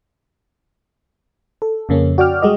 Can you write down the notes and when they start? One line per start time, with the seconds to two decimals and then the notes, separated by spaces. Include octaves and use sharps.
1.62 A4
1.89 F2 C#3 A#3 C#4
2.18 F#4 D5 G5 D6 F6
2.42 G3 G#3 F#4 D#5